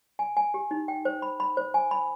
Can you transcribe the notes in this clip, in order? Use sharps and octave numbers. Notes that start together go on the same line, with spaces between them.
G#5
G#5
G4
D#4
G5
C5
B5
B5
C5
G#5
B5